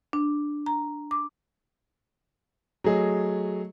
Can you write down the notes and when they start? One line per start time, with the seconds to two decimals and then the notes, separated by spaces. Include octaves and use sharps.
0.13 D4
0.66 A#5
1.11 D6
2.84 F#3 A3 G#4 D#5